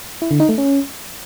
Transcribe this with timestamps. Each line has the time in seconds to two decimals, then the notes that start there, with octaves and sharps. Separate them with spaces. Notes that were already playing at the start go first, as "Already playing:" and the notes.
0.22 E4
0.31 D3
0.40 D#4
0.49 A3
0.58 C#4